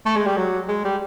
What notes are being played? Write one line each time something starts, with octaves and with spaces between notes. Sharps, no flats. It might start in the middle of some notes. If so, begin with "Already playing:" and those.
A3
G#3
G3
F#3
G#3
G3